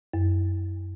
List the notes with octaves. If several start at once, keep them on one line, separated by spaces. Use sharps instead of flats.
F#2